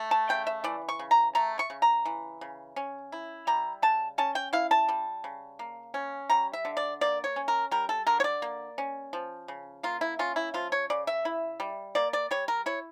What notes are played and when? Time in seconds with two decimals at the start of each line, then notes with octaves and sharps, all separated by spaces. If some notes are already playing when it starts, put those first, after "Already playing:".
Already playing: A3
0.11 A5
0.29 C#3 G5
0.47 E5
0.64 E3 D5
0.89 C#6
0.99 C#3
1.11 A#5
1.35 A3 A#5
1.59 C#6
1.70 C#3
1.82 A#5
2.05 E3
2.41 C#3
2.76 C#4
3.12 E4
3.47 G3 A#5
3.82 C#3 A5
4.18 C#4 A5
4.35 G5
4.53 E4 F5
4.71 A5
4.89 G3
5.24 C#3
5.59 A#3
5.94 C#4
6.30 G3 A#5
6.53 E5
6.65 D3
6.77 D5
7.01 A#3 D5
7.24 C#5
7.36 C#4
7.48 A#4
7.71 G3 A#4
7.89 A4
8.07 D3 A#4
8.20 C#5
8.24 D5
8.42 A#3
8.78 C#4
9.13 F3
9.48 C#3
9.83 A#3 F4
10.01 E4
10.19 C#4 F4
10.36 E4
10.54 F3 F4
10.72 C#5
10.90 C#3 D5
11.07 E5
11.25 E4
11.60 G3
11.95 A#3 D5
12.13 D5
12.31 G3 C#5
12.48 A#4
12.66 E4 C#5